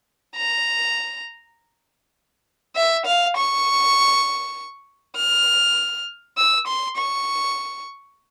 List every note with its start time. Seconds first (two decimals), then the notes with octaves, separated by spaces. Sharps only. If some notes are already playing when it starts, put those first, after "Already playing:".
0.36 A#5
2.76 E5
3.06 F5
3.36 C#6
5.17 F6
6.38 E6
6.68 C6
6.97 C#6